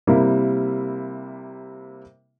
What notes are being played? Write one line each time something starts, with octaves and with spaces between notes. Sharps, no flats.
C3 G3 A#3 E4